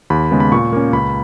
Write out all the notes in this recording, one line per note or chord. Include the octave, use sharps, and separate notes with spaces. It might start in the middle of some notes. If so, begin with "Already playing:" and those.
D#2 B5
C#3 G#3 B3
B5
A#2 C#6
A#3 C#4
C#2 B5